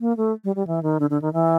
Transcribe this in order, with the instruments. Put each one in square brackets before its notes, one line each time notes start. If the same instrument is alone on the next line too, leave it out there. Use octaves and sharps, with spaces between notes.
[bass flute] A#3
A3
G3
G3
E3
D#3
D3
D3
D#3
E3